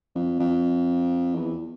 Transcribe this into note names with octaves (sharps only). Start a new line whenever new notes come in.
F2
F2
E2